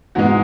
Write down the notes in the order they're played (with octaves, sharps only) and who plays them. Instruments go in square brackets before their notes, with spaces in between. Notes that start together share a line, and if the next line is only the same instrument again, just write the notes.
[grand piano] G#2 E3 G#3 F#4